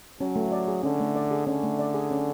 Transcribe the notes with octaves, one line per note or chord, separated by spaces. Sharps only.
F#3 C#4
A3
D5
G#4
D3 C#4
A3
D5
G#4
D3 C#4
A3
D5
G#4
C#4